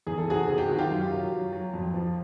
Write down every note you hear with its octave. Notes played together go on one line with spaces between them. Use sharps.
E2 G#4
A4
C3 F#4 G#4
C3 G#4
G4
D#3 F#4
F4 G4
F#2
F#3
F#3
F#3
F2
F3